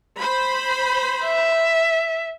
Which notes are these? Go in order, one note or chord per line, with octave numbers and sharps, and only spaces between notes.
C5 B5
E5